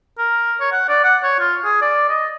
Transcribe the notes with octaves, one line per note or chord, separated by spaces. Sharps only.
A#4
C#5
F#5
D5
F#5
C#5
F4
G#4
D5
D#5